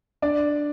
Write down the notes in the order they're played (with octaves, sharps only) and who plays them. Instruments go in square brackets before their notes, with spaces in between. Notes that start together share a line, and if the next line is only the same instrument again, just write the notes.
[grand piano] D4 D5